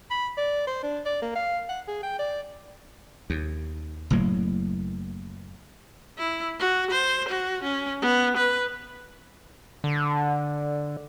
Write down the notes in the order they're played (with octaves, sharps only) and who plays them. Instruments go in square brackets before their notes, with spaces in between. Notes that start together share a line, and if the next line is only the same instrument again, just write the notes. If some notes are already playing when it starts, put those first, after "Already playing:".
[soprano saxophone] B5
D5
C5
D4
D5
A#3
F5
F#5
G#4
G5
D5
[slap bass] D#2
F#1 A2 F#3 A#3
[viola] E4
F#4
C5
F#4
C#4
B3
B4
[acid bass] D3